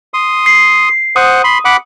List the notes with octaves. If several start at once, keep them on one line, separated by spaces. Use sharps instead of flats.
C6 D#6
C7
C5 F#5 D#6
B5 C6
F#5 B5 D6